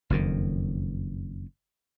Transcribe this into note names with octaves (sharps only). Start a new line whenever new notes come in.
F#1 F2 D#3